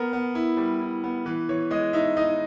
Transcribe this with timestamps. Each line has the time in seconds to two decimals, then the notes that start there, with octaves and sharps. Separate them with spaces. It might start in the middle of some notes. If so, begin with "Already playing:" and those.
Already playing: B3 A#4
0.13 B3
0.35 E4
0.57 G3
0.81 E4
1.04 B3
1.26 E3 B4
1.49 E3 C#5
1.71 G#3 D#5
1.93 D#4 E5
2.17 D#4 D#5